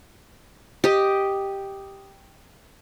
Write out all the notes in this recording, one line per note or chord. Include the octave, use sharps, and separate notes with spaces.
G4 D#5